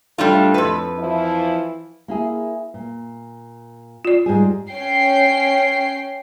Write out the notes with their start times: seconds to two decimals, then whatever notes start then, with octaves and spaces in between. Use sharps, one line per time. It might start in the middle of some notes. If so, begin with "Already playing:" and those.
0.18 A2 G3 D4 F4 A4
0.54 F2 B4
0.99 E3 F3 E4
2.08 A#3 E4 G#4
2.74 A#2
4.05 F4 D5
4.26 G#2 G3 G#4
4.70 C#4 G5 C7